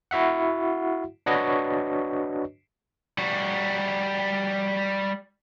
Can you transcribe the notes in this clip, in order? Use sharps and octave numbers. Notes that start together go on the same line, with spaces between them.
E4 F#4 E5 F#5
D4 F#4 B4 C#5 D#5
G3 F#4